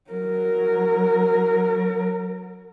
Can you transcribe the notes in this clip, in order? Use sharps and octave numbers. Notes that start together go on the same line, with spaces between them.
F#3 A#4